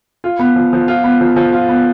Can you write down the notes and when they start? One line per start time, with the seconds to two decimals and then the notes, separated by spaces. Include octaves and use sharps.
0.24 F4
0.39 B3
0.56 F3
0.73 F3
0.88 F4
1.04 B3
1.21 F3
1.36 F3
1.53 F4
1.69 B3